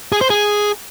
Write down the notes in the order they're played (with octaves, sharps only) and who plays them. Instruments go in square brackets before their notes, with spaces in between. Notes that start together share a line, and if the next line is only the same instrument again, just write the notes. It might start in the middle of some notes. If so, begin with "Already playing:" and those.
[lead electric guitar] G#4
C5
G#4